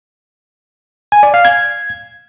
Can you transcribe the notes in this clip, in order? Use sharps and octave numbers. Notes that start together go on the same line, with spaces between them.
G#5
D5
F5
G#6